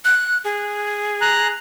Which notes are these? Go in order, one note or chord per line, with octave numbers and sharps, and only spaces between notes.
F#6
G#4
A#5 F#6